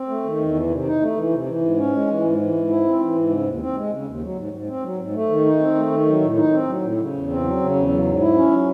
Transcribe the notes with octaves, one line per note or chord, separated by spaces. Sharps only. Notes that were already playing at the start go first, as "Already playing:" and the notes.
Already playing: C4
A3
D#3
E2
E3
C3
D#4
A3
E3
C3
E3
G#2
C#4
G#3
E3
G#2
E3
G#2
E4
C4
E3
G#2
C#3
D#2
C4
G#3
C#3
D#2
F#3
G#2
G#2
C4
F#3
G#2
A3
D#3
D#4
C4
A3
D#3
F#3
A2
D#4
C4
F#3
A2
C#3
E2
C4
F#3
C#3
E2
F#3
G#2
E4
C#4
F#3